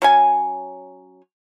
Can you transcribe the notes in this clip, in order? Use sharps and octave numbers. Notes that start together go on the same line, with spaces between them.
F#3 C#4 G#5